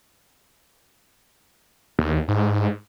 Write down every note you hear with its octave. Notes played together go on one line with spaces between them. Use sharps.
D#2
G#2